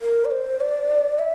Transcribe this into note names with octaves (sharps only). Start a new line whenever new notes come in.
A#4
D5
C5
D5
E5